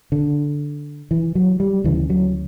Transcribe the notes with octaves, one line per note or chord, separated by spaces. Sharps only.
D3
E3
F#3
G3
D2 C#3 E3
F#3